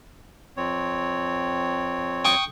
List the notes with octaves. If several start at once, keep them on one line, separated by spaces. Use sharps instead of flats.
F2 C4 C#5
G5 C#6 D#6